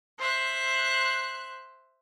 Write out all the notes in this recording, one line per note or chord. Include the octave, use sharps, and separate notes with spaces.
C5 E5 F#6